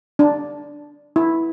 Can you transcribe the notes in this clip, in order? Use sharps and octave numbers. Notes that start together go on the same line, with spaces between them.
D4
E4